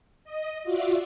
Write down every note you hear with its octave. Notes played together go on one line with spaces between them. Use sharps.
D#5
F4 F#4 D5 E5